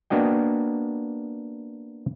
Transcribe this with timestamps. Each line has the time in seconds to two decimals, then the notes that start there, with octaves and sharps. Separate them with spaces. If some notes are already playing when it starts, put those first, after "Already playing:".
0.10 A#3 B3 D4 F#4 D#5 G5